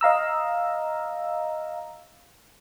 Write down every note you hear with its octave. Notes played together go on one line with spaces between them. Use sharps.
D#5 F5 A#5 E6